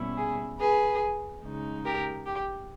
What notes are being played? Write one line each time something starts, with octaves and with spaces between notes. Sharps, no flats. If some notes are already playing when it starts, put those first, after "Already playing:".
Already playing: B2 G3 C#4 E4
G#4
G#4 B4
C#3 G#3 D#4
G4 A#4
G4